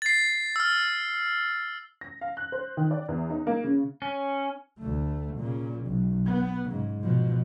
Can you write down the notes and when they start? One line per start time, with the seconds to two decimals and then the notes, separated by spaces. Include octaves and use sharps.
0.02 A6 C7
0.56 E6 F6
2.01 A#6
2.21 F5
2.37 F#6
2.52 C5
2.77 D#3
2.91 D5
3.08 E2
3.30 D#4
3.47 A#3
3.64 C#3
4.02 C#4
4.78 D2 A3
5.37 A#2 C#3
5.87 B1
6.26 B3
6.70 G#2 C#3
7.01 B2 F3